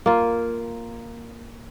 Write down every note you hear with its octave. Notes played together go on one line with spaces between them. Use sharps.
A#3 F4